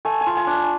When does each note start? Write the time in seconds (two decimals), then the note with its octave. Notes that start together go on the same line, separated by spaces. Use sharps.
0.05 A3 G#5
0.21 G#5
0.26 F4
0.37 G#5
0.47 D4